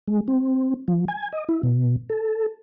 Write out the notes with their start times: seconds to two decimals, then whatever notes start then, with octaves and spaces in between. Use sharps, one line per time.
0.08 G#3
0.28 C4
0.88 F3
1.08 G#5
1.32 D#5
1.49 E4
1.63 B2
2.10 A4